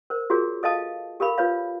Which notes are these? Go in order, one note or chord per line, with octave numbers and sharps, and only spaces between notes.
A#4 C5
F4 F#4 G#4 A#4 C#5
A4 D#5 F5 A5 D#6
G4 A4 A#4 F5 B5
F4 B4 C#5 F5